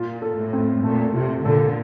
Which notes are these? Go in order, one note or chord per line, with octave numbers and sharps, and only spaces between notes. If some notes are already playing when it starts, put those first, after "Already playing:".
Already playing: A#2 F4
A4
A2
C4
A#2 A3
C3 F4
A#2 D3 A4